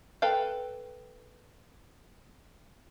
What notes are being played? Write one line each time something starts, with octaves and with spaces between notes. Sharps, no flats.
A4 B4 F5 G5